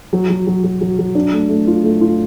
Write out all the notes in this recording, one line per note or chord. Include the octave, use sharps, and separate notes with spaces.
F#3
F#3
F#3
F#3
F#3
F#3
D4
A3
A3
F4
A3
F4